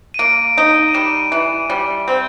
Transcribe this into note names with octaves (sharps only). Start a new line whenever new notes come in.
D#7
A#3 D7
D#4
D#7
G3 E7
E3
G3
C4